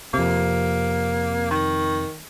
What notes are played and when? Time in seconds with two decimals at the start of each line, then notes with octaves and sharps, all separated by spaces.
0.14 F2 C3 A#3
1.51 D#3